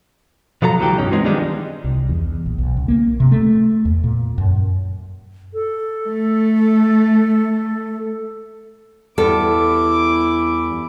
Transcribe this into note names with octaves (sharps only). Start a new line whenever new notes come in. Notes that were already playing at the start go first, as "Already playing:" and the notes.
B2 F3 F#3 A4 A#5
C#2 B2 E3 F#3 G4
C2 G2 E3 C#4 D#4
G#3 B3 C4 D#4
D#3 F3 G3 G#3 D4 D#4
C2
E2
A#1
B1
C#2
A#3
C3
A3
E2
A#2
F#2
A4
A3
E2 G3 E4 A4 D6